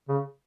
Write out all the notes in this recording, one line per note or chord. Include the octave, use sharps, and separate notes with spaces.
C#3